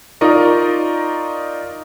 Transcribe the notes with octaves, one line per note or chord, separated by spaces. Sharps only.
D#4 F4 A#4 D5 D#5 C#6